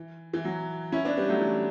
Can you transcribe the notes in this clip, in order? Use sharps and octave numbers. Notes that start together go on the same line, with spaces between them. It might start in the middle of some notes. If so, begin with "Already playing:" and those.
Already playing: E3
E3
F#3
C#4 E4
B3 D4
G3 B3
F#3 A3
E3